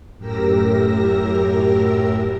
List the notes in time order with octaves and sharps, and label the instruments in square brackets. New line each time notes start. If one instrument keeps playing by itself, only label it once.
[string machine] F#2 A2 G4 A#4 E6 A#6